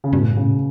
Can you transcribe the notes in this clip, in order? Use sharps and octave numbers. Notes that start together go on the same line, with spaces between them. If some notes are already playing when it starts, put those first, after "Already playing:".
C#3
G2 B2
A2
G2
A2 C#3